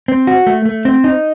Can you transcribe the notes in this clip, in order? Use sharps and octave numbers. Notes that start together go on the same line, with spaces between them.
C4
F#4
A3
A3
C4
D#4